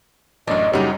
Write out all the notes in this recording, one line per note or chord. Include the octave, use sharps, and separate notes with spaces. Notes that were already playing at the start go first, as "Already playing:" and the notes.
A1 F#2 A3 D4 D#5
F#2 C#3 F#3 G3 D#4 G4